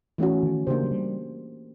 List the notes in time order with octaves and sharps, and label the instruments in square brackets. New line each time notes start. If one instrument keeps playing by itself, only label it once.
[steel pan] E3 A3 C#4 F#4
[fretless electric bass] D#3
[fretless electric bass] C#3 [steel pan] A#3 D4 G4 C5
[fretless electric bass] F#3
G3